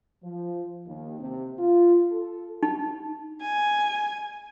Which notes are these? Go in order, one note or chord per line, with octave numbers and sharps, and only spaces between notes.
F3
D#2
C3
F4
A4
D#4
G#5